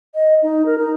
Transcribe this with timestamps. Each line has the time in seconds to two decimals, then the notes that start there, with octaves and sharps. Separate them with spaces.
0.15 D#5
0.42 D#4
0.66 A#4
0.78 D#4